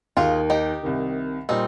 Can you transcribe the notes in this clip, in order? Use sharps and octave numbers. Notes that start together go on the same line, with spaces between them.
D#2 D#3 A#3 F4 G#4
D#4 G4
C2 C3 D#3
A#2 G3 C4 D#4